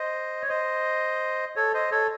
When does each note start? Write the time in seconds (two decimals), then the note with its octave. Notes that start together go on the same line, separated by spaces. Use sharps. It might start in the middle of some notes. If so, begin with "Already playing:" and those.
Already playing: C5 D#5
0.42 C#5
0.49 C5 D#5
1.56 A4 C#5
1.74 C5 D#5
1.91 A4 C#5